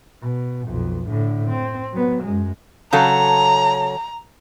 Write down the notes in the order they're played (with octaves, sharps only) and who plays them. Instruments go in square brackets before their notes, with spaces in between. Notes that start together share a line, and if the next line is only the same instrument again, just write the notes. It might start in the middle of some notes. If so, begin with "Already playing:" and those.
[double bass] B2
B1 F2
A2 D3
C4
F#3 B3
F#2 G#3
[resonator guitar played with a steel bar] C#3 F#3 A4 [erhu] A#5